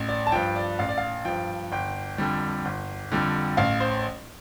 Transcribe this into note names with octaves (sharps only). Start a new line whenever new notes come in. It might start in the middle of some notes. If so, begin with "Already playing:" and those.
Already playing: A1
D5
A5
G2 F3 G5
D5
A1 F5
D5
F5
G2 F3 G5
G1 G5
F2 D3 G3
G1
F2 D3 G3
A1 F5
C5